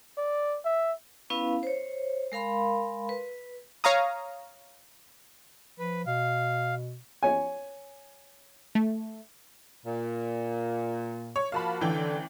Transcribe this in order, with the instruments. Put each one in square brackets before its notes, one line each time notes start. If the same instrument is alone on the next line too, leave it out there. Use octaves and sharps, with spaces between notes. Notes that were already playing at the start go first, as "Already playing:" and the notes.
[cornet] D5
E5
[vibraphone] B3 C#4 E4 B4 F5
C5 C#5
G#3 A#4 F5 B5 C6
B4
[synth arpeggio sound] C#5 F5 A#5 D#6
[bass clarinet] F3 [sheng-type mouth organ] B4
[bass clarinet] B2 [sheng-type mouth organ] F5
[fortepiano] C#5 G#5
[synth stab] A3
[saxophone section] A#2
[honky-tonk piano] C#5
[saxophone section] F3 A#3 F#4 [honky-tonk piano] F5 A5 B5
[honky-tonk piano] A1 E3 G5 [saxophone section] D3